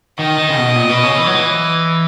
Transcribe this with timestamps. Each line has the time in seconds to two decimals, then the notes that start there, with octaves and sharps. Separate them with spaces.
0.19 D#3 D#5
0.38 D#3
0.49 C#3
0.57 B2
0.76 A#2
0.89 B2
1.03 C#3
1.18 E3
1.26 F#3
1.35 E3